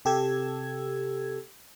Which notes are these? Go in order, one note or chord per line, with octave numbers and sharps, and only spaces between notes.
C3 G4 A4 E6 G#6